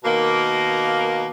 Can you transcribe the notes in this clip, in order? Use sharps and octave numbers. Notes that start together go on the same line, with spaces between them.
B2 D#3 A#3